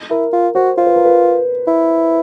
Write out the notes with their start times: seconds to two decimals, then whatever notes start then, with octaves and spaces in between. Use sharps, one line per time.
0.10 E4 A#4
0.33 F4
0.55 F#4 C5
0.78 F4 C5
0.87 B4
0.96 A#4
1.05 B4
1.67 E4